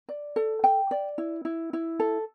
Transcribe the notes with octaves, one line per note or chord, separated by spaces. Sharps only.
D5
A4
G5
D5
E4
E4
E4
A4